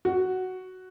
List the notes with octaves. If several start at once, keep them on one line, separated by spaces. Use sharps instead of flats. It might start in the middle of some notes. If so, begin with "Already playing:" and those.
F#4